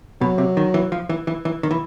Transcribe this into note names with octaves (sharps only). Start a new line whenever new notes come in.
B2 F#3
C3
D#3
E3
F3
E3
E3
E3
D#3
E3